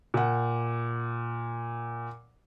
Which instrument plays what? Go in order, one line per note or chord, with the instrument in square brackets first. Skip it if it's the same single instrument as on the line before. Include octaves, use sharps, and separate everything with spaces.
[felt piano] A#2 F#5